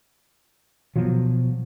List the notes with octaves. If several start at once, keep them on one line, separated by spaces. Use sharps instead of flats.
B2 F3 F#3